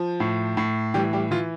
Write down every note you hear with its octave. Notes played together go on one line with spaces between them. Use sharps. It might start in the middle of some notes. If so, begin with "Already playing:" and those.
Already playing: F3
A2
A2
E3 G3 G4
G3 G4
E3 F4